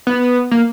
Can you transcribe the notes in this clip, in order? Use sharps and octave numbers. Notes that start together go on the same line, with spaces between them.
B3
A#3